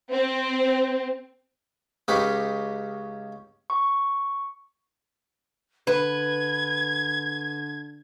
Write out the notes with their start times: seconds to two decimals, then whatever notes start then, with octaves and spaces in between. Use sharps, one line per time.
0.10 C4
2.08 C#2 C#4 D#4 G4 B5
3.70 C#6
5.87 D3 B4 G#6